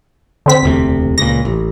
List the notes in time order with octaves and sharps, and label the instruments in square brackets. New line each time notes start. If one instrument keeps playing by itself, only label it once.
[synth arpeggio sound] D3 C4 B6
[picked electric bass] E1 D2 C3
[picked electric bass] C#2 A#2 [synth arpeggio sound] A#6
[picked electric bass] A1